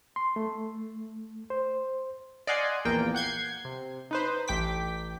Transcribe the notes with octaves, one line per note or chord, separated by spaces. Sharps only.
C6
A3
C5
D5 D#5 F5 F#5 G#5 C6
A#1 E2 A#3 G5
F#5 G6 G#6 C7
C3
D#4 B4 C5
A1 G5 D6 B6